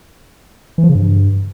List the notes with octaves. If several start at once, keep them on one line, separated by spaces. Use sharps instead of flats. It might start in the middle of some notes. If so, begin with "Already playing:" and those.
E3
F3
C#3
G2